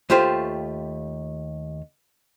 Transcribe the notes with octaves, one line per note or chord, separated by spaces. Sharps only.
D#2 A3 F4 G4 C5